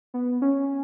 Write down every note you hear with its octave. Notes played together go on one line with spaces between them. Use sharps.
B3
C#4